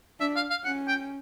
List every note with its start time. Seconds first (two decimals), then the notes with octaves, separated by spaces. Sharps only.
0.20 D4 E5
0.36 F5
0.50 F5
0.65 C#4 F#5
0.88 G5